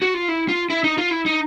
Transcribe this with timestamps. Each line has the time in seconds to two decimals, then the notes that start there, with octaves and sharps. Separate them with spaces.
0.02 F#4
0.14 F4
0.28 E4
0.49 F4
0.70 E4
0.84 D#4
0.98 F4
1.11 E4
1.26 D#4